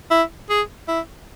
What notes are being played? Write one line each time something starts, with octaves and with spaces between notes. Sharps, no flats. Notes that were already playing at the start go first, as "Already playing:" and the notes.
E4
G#4
E4